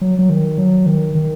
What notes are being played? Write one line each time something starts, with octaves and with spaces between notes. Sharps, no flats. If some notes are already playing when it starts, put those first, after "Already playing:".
F#3
F#3
D#3
F#3
D#3
D#3